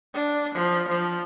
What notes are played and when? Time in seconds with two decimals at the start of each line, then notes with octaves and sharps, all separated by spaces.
0.14 D4
0.55 F3
0.89 F3